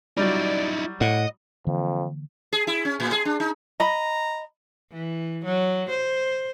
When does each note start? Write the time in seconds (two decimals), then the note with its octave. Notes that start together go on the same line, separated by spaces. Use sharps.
0.17 F#3 G3 D#4 E4 D5
1.01 A2 D#5 F#5
1.67 F2 D3 E3 A#3
2.52 G#4
2.67 E4
2.85 C#4
3.00 A2
3.12 G#4
3.25 D4
3.40 D#4
3.80 D#5 A#5 B5
4.91 E3
5.45 F#3
5.90 C5